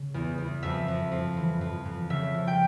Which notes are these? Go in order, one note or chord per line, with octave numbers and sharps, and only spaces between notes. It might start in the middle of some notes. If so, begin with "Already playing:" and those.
Already playing: C#3
E2
E2
F2 E5
F2
F2
E3
F2
F2
C#3 E5
F3
G5